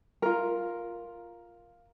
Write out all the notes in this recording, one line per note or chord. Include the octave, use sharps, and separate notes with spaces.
F4 A#4